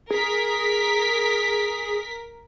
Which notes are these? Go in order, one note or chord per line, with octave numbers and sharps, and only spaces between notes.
G#4 A#4 B6